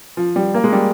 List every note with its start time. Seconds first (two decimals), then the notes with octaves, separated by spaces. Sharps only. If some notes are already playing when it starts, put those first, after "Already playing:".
0.17 F3
0.36 G3
0.54 A#3
0.64 G#3
0.73 G3